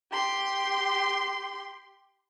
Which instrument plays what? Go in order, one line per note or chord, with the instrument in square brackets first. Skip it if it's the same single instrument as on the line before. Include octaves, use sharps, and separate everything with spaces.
[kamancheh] G4 C6